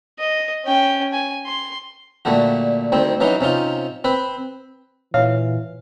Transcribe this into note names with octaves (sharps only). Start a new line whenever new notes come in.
D#5
C#4 G5
G#5
C6
A#2 D3 G3 A3 F#4
D2 D#3 G3 C4
E3 F#3 C#4 D#4 F#4
C3 C#4 D#4 F4
C4 B4 C5
A#2 E3 C#5 F5